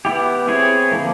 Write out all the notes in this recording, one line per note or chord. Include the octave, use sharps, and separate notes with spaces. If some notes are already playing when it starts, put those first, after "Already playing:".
B3 E4 G4
C4 E4 G#4 C#5
D3 F3 A#3